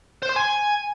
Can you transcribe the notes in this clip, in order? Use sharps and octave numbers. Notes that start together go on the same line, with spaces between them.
C5
C6
G#5